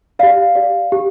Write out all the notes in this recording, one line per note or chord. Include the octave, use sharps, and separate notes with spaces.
G4 D5 F5
G4 D5
G4